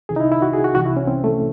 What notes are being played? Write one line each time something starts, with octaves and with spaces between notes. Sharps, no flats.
C2 C3 D#3 G#4
D#4
E4
E4
F#4
G#4
F#4
C2 C3 E3 F#4
E4
C#4
C4
A3